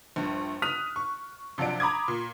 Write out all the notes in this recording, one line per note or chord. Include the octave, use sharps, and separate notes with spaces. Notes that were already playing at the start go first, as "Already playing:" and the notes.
A#1 G2
D#6 F6 F#6 B6 D#7 F7
C#6
C3 F3 F#3 D4 D7
A#5 B5 D6 D#6 G#6
A#2